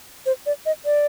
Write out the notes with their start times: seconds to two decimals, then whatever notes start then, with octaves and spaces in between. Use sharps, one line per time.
0.26 C5
0.46 D5
0.66 D#5
0.85 D5